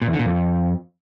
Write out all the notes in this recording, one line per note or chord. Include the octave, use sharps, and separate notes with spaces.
A#2
E2
D3
A#2
F2